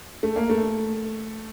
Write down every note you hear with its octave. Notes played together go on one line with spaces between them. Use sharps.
A3
A#3
A3